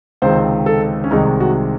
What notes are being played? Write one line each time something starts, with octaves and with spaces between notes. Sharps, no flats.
C#2 C3 D#3 G#3 C4 C5
A4
C#4
C2 C3 D#3 G#3 D#4
F#4